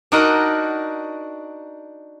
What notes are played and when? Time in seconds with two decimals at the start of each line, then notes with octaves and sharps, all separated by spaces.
0.12 D4 D#4 F#4 A#4 D#5 F#5